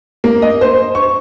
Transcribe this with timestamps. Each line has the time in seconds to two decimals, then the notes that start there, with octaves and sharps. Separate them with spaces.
0.24 A#3
0.42 D#5
0.61 C5
0.95 C#6